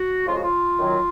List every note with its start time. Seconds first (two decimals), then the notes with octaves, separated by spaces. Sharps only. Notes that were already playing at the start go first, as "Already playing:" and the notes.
Already playing: F#4
0.26 F2 C#3 F3 G#3 F4
0.35 F#4
0.43 F4
0.79 F#2 D#3 F#3